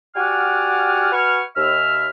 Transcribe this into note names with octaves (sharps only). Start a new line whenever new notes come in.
F#4 G4 D5 F#5 G#5 F6
F#4 B4 G#5 C#6 F6
D#2 E5 F6